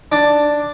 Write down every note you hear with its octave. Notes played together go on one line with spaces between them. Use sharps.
D4